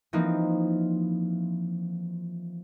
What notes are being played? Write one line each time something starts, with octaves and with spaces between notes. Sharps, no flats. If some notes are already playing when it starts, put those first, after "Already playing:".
E3 F3 A#3 C4 D#4